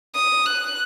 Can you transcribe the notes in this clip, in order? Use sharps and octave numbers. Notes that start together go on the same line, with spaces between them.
D#6
F#6